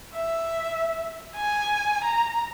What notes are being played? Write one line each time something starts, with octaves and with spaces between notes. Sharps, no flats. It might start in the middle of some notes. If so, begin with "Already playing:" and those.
E5
G#5
A#5